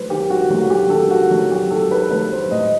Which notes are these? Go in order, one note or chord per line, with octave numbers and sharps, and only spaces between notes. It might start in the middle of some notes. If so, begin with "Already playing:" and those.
Already playing: D#3 F#3 A3 B4 C5
D#3 G4
F#4
F#3 A3 F#4
G4
D#3 A4
F#4
F#3 A3
G4
D#3 A4
B4
F#3 A3 B4
C5
A2 D#5